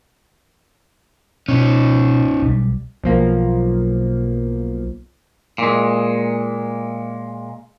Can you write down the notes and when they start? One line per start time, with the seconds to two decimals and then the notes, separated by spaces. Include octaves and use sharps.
1.49 B2 C#4 D#4
2.42 B1 G3
3.04 B1 F3 A#3
5.58 A#2 G#3